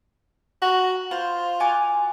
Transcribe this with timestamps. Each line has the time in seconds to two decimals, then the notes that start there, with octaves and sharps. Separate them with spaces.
0.62 F#4 A#5
1.11 F4 C5
1.60 F#4 G#5 D6